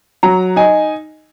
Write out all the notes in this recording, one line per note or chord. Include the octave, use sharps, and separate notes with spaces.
F#3 A#5
D#4 G#5